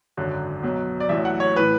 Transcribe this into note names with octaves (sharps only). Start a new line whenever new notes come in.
G#1 F#2 D3 F#3
B1 B2 F#3
D5
A1 A2 F#3 E5
F#5
C#5
A2 E3 B4